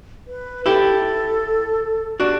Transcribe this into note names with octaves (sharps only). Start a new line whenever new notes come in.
B4
E4 G4 A4
D4 F#4 G4